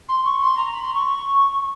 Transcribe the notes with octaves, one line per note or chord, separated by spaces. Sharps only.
C6
C#6
C6
A#5
B5
C6
C#6